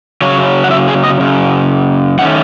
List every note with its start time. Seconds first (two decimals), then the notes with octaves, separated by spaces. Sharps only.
0.22 C#3 F#3 C#4 C#5
0.64 F#5
0.71 E5
0.88 G#4
1.04 D#5
1.20 F#2 C#3
2.19 D#3 A3 C#4 F#5